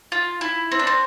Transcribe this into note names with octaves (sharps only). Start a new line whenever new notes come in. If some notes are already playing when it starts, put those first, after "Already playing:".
F4
E4
C4
D4
C4